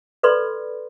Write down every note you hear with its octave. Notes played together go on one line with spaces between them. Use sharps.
A4 B4 D5 B5 C6